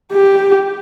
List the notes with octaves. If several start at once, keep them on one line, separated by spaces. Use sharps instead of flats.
G4